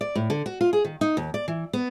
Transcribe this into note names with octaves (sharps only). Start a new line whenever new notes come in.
D5
A2
D3
F#4
F4
G#4
D#3
D#4
D#2
D5
E3
B3